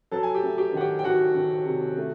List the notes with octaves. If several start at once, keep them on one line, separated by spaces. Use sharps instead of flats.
F#3 A4 A5
G#5
G4 G5
A3
G4 G5
D#3 F#5
G4 G5
G5
D#3 F#4 F#5
D#3
C3
A3